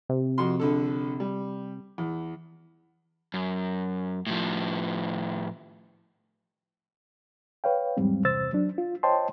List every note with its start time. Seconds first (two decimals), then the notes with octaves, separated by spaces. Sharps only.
0.09 C3
0.38 F2 F#4 C6
0.60 A#1 D3 A4
1.20 G3
1.98 E2
3.34 F#2
4.27 A2 F3
7.64 B4 C#5 F5 G5
7.97 E2 G#2 F#3 G3 C4
8.25 E2 G2 C3 C5 E6 A6
8.53 F#3 D4
8.78 F4
9.03 C5 C#5 D#5 G5 A5 C6